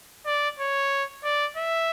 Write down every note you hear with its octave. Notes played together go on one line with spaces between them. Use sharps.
D5
C#5
D5
E5